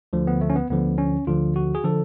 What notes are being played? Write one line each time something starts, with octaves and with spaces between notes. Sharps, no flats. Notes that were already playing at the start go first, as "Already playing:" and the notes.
D2 D3 F3
B3
A3
C#4
B3
D2 D3 F3 B3
C#4
D2 D3 F3 F4
F#4
G#4
D3 F3 A4